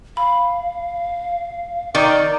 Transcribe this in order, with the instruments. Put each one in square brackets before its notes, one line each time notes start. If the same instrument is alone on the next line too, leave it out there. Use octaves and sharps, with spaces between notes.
[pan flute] F5 [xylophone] B5
[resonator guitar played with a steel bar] D#3 [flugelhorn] D5 [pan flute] A#5 [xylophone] C#6